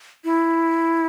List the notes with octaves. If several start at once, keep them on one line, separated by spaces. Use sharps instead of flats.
E4